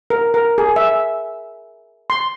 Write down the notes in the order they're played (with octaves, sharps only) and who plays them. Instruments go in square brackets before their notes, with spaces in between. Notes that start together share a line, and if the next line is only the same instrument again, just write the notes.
[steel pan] A#4
A#4
G#4
E5
C6